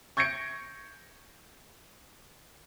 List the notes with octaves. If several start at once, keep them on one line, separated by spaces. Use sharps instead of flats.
C#6 G6 G#6 A#6 C#7 D7